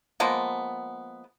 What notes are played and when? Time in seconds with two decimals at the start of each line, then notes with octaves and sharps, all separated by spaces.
0.20 F3 G#3 A#3 B3